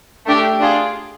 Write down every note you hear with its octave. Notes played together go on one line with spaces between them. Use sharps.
A3 D4 G4
D4 F4 G#4